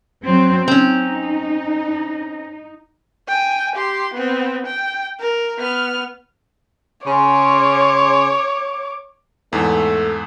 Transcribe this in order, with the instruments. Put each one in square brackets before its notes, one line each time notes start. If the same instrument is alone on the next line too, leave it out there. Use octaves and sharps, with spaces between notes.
[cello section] F#3 C4
[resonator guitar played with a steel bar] C4 C#4 [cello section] D#4
[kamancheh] G5 G#5
G4 C6
B3 C4
G5
A#4
B3 F6
[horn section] C#3 C#4 C6 [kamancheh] C#5 D6
[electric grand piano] E2 G#2 [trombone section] A3